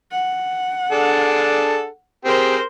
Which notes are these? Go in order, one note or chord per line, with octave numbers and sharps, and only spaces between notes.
F#5
D4 G#4 A4
C4 G4 G#4 A#4 C5